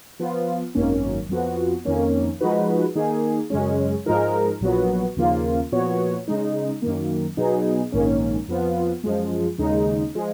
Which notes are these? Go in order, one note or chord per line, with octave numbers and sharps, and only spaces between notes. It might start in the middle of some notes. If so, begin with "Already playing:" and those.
F3 B3 F4
G#1 F#2 D#3 A#3 C#4
F2 F3 B3 F#4
F2 D#3 A#3 C#4
F3 G#3 D#4 F#4 B4
D#3 A#3 D#4 G#4
F#2 C#3 G#3 C#4
G#2 F3 G#3 D#4 A#4
A#1 A#2 F#3 B3 F#4
D#2 C#3 F3 A#3 F4
A#2 F3 B3 F#4 C#5
C#3 G#3 D#4
F#2 D#3 A#3
B2 F#3 B3 D#4 G#4
A#1 G#2 D#3 A#3 C#4
F2 F3 B3 F4
F#2 F3 G#3
D#2 C#3 G#3 D#4
F3 G#3